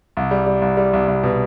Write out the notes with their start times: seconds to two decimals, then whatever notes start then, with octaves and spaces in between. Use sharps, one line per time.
0.17 C2
0.31 G3
0.46 G3
0.62 C2
0.77 G3
0.93 C2
1.08 C2
1.23 B2